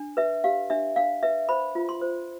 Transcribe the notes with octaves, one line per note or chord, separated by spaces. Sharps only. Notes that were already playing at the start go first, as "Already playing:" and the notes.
Already playing: D4
B4 E5
G4 F5
D4 E5
D4 F5
B4 E5
C5 B5
F4
C6
C5